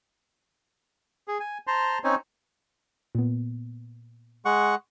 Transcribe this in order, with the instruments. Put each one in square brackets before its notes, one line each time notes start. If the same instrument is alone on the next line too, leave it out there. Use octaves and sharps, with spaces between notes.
[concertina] G#4
G#5
C5 A5 A#5 C6
C4 C#4 D#4 C5 C#5
[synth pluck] A#2 B3
[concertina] G#3 F#5 C#6